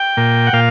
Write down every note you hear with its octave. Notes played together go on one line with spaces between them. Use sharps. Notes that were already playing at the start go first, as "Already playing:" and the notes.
Already playing: G5
A#2
F#5
A#2 F5